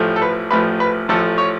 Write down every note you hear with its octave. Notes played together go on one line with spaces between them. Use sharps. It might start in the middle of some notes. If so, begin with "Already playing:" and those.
Already playing: A1 A2 F3
A4
B4
A1 A2 F3 B4
B4
A1 A2 F3 A4
C#5